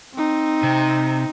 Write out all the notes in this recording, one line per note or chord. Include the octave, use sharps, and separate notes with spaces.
C4 D#4
C3